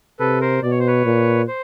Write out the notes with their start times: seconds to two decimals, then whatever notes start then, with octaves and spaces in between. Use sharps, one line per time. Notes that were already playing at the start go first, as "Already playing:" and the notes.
0.19 C3 A4 B4
0.41 A#4 C5
0.63 B2 D5
0.71 C#5
0.79 C5
0.87 B4 C#5
1.05 A#2
1.48 C5